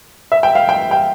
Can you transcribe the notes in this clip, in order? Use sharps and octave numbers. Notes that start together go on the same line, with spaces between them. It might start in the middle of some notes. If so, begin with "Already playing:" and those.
E5
G5
F5
G5
G5